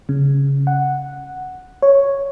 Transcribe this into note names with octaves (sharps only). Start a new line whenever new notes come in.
C#3
F#5
C#5